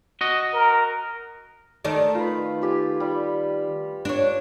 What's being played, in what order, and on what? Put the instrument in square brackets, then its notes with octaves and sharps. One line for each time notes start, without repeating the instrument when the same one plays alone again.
[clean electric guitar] F#4 D#5
[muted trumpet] A#4
[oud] D#3 A3 D5
[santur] F4 B4
F4 G4 G#5
G3
[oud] D4 C#5